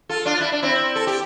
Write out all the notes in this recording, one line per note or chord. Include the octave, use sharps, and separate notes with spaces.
F4 A4
D4 F4
E4
D4
C4 E4
A4
G4